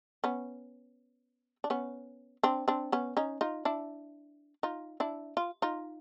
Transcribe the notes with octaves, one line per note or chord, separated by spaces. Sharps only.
B3 C#4
D4
B3 C#4
C4 D4
C4 D4
B3 C#4
C#4 D#4
D#4 F4
D4 E4
D#4 F4
D4 E4
F4
D#4 F4